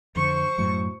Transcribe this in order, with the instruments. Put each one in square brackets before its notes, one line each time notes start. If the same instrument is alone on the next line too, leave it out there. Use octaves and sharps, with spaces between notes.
[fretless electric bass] F2 D3 [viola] C5 C#6
[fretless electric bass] F#2 A2 F#3